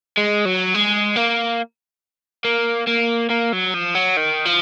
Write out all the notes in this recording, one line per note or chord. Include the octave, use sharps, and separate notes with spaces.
G#3
F#3
G#3
A#3
A#3
A#3
A#3
F#3
F3
F#3
D#3
F3